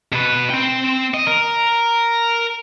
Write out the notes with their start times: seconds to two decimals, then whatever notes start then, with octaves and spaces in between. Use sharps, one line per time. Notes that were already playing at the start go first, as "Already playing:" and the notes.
0.12 B2 B4
0.50 C4 G5
1.14 D#5
1.27 A#4